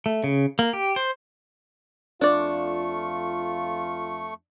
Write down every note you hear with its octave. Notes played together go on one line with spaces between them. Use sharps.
A3
C#3
A#3
G4
C5
F2 A3 D4 F4 D5 C#6